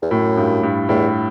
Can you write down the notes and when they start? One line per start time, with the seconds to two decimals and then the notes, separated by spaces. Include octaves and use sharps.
0.02 E2
0.11 F#2 A2
0.37 G2
0.63 G2
0.89 E2 A2